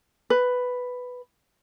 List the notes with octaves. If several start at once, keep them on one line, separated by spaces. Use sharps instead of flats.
B4